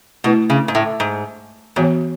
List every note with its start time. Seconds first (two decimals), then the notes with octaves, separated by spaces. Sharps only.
0.24 B2 A3 E4 B4
0.50 C#3
0.68 G#2
0.75 A2
1.00 G#2
1.76 G#2 E3 B3 F#4 C#5